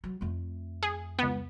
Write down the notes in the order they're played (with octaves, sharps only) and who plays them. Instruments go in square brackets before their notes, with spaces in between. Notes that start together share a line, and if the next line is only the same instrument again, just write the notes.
[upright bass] F#3
F2 A3
[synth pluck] G#4
C#2 B3